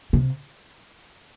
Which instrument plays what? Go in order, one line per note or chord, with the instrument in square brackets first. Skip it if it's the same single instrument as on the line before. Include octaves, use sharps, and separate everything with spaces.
[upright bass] C3